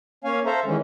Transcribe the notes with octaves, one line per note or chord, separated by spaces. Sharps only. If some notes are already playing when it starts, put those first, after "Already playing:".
A#3 C#4 C#5 F5 G#5
A4 C5 E5 F5 A#5
D#3 E3 G#3 C#4